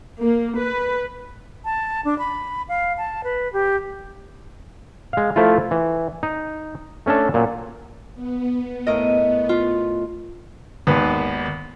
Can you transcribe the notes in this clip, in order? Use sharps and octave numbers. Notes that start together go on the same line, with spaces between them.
A#3
B4
A5
D4
B5
F5
A5
B4
G4
G#3 F5
F3 A3 E4 F4
E3
D#4
A3 C#4 D4 A4
A#2 F#3
B3
A2 A#4 D#5
F4
G#1 D#2 B3 B4